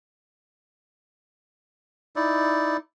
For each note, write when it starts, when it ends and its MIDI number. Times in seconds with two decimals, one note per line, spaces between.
2.16 2.77 63
2.16 2.77 64
2.16 2.77 74